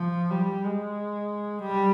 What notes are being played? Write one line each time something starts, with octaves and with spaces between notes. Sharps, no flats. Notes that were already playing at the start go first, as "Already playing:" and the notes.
Already playing: F3
G3
G#3
G3